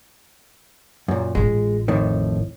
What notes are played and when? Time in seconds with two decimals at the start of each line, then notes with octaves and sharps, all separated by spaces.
1.08 F#2 A#2
1.35 A1 G#3 F4
1.88 F2 A2 D#3